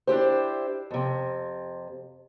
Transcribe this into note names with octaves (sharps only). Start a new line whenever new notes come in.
D4 E4 G4 C5
F2 C3